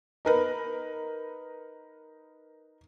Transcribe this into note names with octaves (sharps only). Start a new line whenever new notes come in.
D#4 A#4 B4